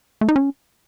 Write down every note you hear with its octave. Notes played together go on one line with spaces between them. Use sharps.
A3
D#4
C#4